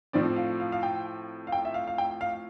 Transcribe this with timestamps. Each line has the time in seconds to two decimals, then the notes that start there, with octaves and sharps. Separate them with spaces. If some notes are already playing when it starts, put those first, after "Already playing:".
0.13 A2 F3 C4 D5
0.36 F5
0.60 F5
0.72 F5
0.83 G5
1.47 F5
1.52 G5
1.65 E5
1.74 F5
1.87 F5
1.98 G5
2.21 F5